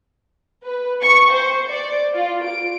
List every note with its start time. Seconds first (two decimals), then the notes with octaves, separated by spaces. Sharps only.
0.64 B4
1.02 C#6
1.33 C5
1.69 D5
2.14 F4
2.45 D7